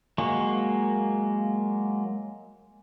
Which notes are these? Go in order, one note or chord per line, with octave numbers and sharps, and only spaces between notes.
F#3 G#3 A#3 C#6